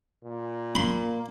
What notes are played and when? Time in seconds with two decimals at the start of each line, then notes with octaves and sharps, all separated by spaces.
0.24 A#2
0.75 A#3 B5 C6